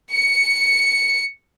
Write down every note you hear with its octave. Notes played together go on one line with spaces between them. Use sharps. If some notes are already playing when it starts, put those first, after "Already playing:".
C#7